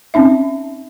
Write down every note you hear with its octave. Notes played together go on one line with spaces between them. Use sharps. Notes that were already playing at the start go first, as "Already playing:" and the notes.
C4 C#4 D#4 E5